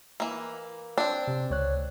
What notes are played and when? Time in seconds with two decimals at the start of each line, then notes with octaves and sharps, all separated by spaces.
0.20 E3 A#3
0.98 C4 D4
1.28 C3
1.50 C#2 C#5 F#6